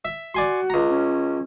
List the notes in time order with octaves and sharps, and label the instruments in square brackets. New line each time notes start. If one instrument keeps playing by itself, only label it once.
[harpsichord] E5
[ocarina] F#4 [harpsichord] D5 G#5 C6
[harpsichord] C#2 A#5
[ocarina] C#4